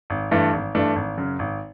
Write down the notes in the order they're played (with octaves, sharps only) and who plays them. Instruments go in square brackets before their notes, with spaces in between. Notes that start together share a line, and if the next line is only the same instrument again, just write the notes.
[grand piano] G#1
G2 E3 A3 D4
G#1
G2 E3 A3 D4
G#1
F#2 C#3
G#1